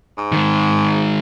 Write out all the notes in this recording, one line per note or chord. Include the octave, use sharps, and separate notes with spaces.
G#2
D#3 G#3